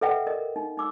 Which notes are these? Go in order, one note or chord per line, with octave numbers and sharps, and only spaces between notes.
A4 B4 D#5 E5 F#5 G5
A#4 D#5
D#4
D#4 D6 E6